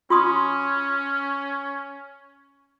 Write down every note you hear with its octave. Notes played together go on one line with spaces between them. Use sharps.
C#4 F4 C6 D#6